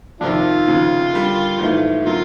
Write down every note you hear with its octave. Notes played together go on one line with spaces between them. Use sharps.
F2 C3 D#3 D4 F4
D#2 C#3 F3
D3 G3 A#3
G#1 G#2 E3 A3
D3 F#3 A#3 F4